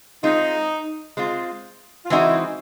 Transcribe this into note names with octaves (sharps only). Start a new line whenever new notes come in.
G#3 C4 D#4 F4
G#3 C4 F4
F4
E3 G#3 C4 D#4 E4 F#4